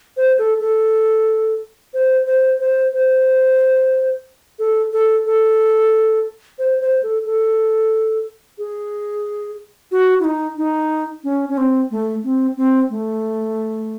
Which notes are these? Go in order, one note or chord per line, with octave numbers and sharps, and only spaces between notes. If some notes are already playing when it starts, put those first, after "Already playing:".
C5
A4
A4
C5
C5
C5
C5
A4
A4
A4
C5
C5
A4
A4
G#4
F#4
E4
D#4
D#4
C#4
C#4
C4
A3
C4
C4
A3